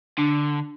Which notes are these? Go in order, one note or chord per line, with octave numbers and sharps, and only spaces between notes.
D3 D4